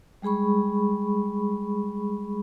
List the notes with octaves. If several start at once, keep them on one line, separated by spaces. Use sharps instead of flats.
G3 G#3 G#4 B5 C#6